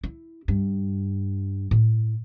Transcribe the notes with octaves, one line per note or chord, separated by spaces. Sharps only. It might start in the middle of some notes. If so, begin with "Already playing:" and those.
E4
G2
A2